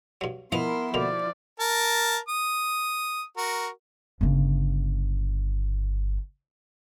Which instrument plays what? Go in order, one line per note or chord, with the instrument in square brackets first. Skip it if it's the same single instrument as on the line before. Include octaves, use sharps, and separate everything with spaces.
[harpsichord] G2 F#3
[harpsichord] F3 D#4 B4 [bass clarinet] B3 [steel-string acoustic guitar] E4 [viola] A#4 C6
[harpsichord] B2 D3 A#3 [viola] F3 D5
[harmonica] A#4 A5
D#6
F#4 A#4
[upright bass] G1 C#3